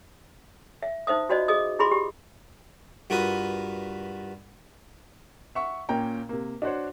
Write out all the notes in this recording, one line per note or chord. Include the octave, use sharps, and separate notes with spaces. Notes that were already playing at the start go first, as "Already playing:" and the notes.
E5
D#4 C5 E5 D#6
F4 F#4 C5 D5 D#5
G#4 D#5 D#6
E4 F4 G#4 B5 C6 D6
G4
G2 F4 F#4 A#4 B4 D#6
E5 F#5 C#6
A#2 A#3 C#4 G5 A#5
C3 A#3
D4 F#4 C5 C#5